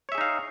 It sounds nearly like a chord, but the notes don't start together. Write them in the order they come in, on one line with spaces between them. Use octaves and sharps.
C#5 E5 G#4 D#4 F5